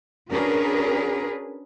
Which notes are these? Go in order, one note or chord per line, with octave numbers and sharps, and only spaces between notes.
C#4 D4 F#4 G#4 A#4 B4